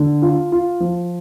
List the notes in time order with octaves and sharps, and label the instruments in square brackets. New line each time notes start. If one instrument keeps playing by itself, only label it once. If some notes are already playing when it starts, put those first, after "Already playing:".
Already playing: [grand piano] D3
F4
F4
F3